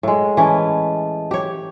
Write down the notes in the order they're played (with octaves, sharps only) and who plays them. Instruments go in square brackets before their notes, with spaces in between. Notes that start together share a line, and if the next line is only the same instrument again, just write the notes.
[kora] A2 G#3
[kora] E3 C#4 [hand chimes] D#5 A5
[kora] G4 C#5